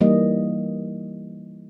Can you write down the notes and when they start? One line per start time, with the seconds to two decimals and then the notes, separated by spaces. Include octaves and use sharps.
0.01 E3 G3 A#3 D#4 D#5